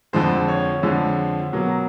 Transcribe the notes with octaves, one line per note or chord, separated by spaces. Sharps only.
F2 D3 F3 G#3 C5
C#5
F2 D3 F3 G#3
B2 F#3 A#3